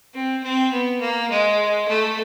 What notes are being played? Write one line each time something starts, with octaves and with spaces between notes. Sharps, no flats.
C4
C4
B3
A#3
G#3
A3